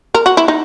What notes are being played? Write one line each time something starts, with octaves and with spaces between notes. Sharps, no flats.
A#4
F#4
E4
D#4